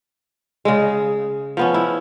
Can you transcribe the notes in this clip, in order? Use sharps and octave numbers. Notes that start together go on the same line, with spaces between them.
C#3 G#3
F3 B3 C#4
E4